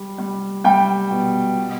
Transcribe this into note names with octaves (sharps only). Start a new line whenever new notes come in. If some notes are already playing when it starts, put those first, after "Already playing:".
Already playing: G3
G3
G3 G5
B2
B2